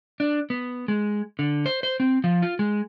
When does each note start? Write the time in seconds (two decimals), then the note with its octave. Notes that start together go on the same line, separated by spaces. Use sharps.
0.20 D4
0.50 B3
0.88 G#3
1.39 D3
1.66 C5
1.83 C5
2.00 C4
2.24 F3
2.42 F4
2.59 G#3